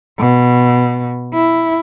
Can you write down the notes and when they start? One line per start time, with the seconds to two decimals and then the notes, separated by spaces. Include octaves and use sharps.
0.19 B2
1.34 E4